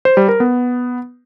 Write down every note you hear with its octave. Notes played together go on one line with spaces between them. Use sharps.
C5
G3
A#4
B3